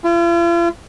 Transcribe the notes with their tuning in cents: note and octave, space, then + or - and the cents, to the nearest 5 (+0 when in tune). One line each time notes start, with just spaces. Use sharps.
F4 -45